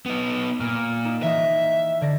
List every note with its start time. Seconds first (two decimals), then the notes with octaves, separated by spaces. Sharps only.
0.06 B3 D#4
0.60 A#2 F6 D7
1.05 A#3 D#4 E7
1.23 E3 D#5 E5
2.01 D3 D5 A#6